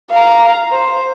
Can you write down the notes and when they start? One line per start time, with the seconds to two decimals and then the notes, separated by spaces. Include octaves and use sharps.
0.11 F5 A#5
0.71 C5